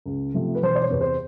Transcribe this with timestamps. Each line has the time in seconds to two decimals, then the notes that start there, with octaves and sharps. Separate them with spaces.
0.06 C#2
0.34 C3 F3 A3
0.55 B4
0.62 E1 C5
0.75 D5
0.82 C#5
0.90 E2 C3 B4
1.01 C5